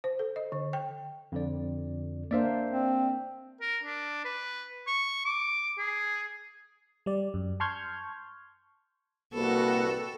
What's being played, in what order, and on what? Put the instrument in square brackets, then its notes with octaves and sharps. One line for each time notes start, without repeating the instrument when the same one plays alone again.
[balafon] C5
A4
D#5
D3
G5
[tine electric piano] F2 D3 D5
[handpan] A#3 D4 C5 [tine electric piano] D5 E5 F5
[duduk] C4
[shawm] A#4
D4
B4
C#6
D6
G#4
[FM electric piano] G3 D5
F#2
A5 C6 C#6 F6 G6 G#6
[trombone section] C2 C3 B4 [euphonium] A#3 [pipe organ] F#4 [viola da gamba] A4